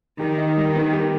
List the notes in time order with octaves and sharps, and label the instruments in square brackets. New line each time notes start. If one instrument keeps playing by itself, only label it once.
[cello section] D#3 [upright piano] G4
[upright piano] D#4
G3
B3
G4